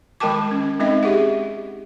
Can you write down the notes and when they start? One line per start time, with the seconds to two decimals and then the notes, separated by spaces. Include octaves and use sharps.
0.20 D#3 G#3 A#4 G5 A5 D6
0.51 C#4
0.80 G#3 C4 D#4 D#5 E5
1.03 G4 G#4 E5 F#5